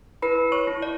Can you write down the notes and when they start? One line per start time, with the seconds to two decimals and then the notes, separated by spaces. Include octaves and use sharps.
0.22 E4 B4 B5
0.52 C#5 C#6
0.67 E4
0.82 D5